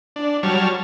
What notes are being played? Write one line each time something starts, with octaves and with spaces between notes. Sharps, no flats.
D4
F#3 G3 C#5 A5 F6